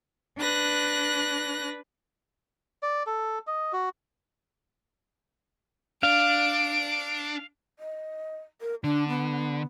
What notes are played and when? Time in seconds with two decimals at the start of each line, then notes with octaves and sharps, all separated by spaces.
0.39 D4 B4 F#6 A#6
2.83 D5
3.06 A4
3.47 D#5
3.73 F#4
6.03 D4 F5 D7
7.79 D#5
8.61 A#4
8.84 D3 D4
9.08 B3